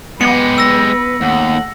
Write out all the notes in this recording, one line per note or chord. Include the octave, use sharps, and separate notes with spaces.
G#3 B3 G4 B4 C#7
E6 A#6
D#2 A3 F#5